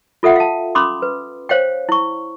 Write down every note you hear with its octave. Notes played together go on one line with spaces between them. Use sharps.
F4 A4 E5 F#5 G5
F5 A5
C#4 B5 C6 D6 D#6
B4
C5 C#5 F5 G5
E4 C#6